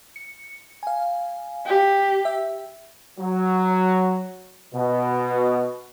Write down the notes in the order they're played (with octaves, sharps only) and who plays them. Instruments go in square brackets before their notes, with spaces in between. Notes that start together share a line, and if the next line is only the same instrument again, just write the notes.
[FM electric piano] C#7
F5 G#5
[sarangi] G4
[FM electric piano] E5
[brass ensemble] F#3
B2